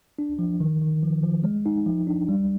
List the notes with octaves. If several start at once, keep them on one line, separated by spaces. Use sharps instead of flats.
D4
F3
D#3
D#3
F3
F3
G#3
D#4
F3
D4
G3